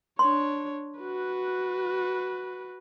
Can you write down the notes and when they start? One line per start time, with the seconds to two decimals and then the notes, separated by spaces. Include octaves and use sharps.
0.19 D4 C#5 C6
1.00 F#4 B4